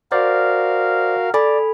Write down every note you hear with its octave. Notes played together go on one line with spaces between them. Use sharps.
F#4 A#4 C5 D5 F5
A4 D5 G#5 B5